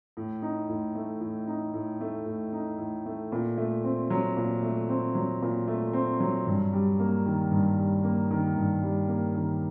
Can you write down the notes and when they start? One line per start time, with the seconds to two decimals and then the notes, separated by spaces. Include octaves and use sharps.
0.17 A2
0.42 D#4
0.69 A2
0.95 A3
1.21 A2
1.47 D#4
1.74 A2
2.01 A3
2.26 A2
2.53 D#4
2.78 A2
3.06 A3
3.32 A#2
3.58 A3
3.84 C4
4.10 F#3
4.37 A#2
4.63 A3
4.89 C4
5.15 F#3
5.42 A#2
5.68 A3
5.93 C4
6.20 F#3
6.46 G2
6.73 G3
6.99 A#3
7.26 D#3
7.51 G2
7.78 G3
8.04 A#3
8.31 D#3
8.57 G2
8.83 G3
9.08 A#3
9.35 D#3